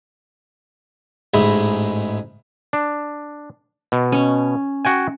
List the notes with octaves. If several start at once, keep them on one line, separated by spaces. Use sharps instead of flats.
A1 G#2 G#3 E4
D4
B2
C#4
F#4 G5 G#5